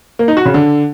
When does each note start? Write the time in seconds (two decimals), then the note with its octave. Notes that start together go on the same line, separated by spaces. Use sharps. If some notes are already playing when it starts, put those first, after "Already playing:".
0.19 A#3
0.28 D#4
0.37 F#4
0.45 C#3
0.54 D3